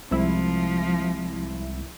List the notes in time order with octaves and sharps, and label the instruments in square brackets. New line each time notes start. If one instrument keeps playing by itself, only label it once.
[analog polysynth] C2 E4 [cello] F3 [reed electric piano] G3 G#3 C4